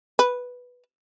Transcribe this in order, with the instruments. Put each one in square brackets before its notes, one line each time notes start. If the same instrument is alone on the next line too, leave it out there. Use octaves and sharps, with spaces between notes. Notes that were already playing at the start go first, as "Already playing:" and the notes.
[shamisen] B4